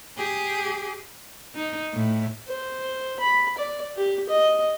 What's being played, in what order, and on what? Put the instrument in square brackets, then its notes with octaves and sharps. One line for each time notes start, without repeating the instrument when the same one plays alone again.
[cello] G4 G#4
[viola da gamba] D#4
A2
[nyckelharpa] C5
B5
D5
G4
D#5